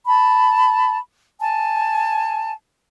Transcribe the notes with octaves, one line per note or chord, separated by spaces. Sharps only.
A5 B5
G#5 A5